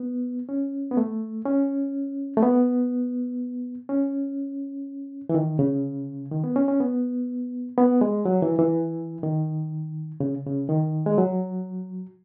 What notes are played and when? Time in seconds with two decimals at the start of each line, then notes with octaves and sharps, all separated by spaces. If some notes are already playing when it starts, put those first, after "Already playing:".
Already playing: B3
0.49 C#4
0.91 B3
0.97 A3
1.45 C#4
2.37 A3
2.43 B3
3.89 C#4
5.29 E3
5.35 D#3
5.59 C#3
6.32 D#3
6.44 B3
6.56 C#4
6.68 C#4
6.80 B3
7.78 B3
8.01 G#3
8.25 F#3
8.42 E3
8.59 E3
9.23 D#3
10.20 C#3
10.47 C#3
10.69 D#3
11.06 G#3
11.18 F#3